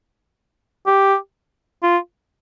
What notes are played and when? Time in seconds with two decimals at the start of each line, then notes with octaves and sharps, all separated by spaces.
0.87 G4
1.83 F4